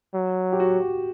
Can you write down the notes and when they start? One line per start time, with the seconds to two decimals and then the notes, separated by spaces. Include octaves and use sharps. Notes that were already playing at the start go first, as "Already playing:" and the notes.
0.14 F#3
0.53 G4
0.60 F#4